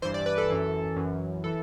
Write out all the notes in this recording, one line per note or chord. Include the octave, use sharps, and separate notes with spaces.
G2 E3 C5
D5
B4
A4
F#2 E3
F#2 E3
E3 A4